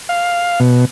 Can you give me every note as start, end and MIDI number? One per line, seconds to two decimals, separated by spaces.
0.09 0.60 77
0.60 0.85 47